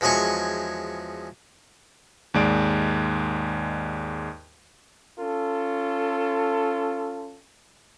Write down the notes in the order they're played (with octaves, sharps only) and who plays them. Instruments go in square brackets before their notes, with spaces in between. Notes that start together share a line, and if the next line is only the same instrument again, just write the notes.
[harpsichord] E2 F3 F#3 G#3 G#5 C#6
[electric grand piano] D#2 G#2 G#3 D5 D7
[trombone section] C#4 F4 A4